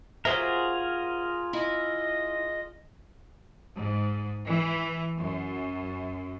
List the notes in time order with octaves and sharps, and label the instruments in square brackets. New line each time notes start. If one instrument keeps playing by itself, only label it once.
[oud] F#3 C5 E5 [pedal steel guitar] F4 G#4 A#4
[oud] E4 [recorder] D#5
[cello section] G#2
E3
F#2